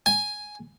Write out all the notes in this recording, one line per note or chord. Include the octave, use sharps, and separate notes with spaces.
G#5